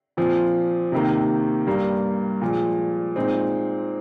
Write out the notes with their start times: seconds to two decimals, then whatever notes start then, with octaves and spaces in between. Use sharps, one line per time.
0.17 A#2 F3 C4
0.92 C3 D#3 A#3
1.67 G2 G3 A#3
2.42 A#2 F3 G#3
3.16 A#2 G#3 C4 D#4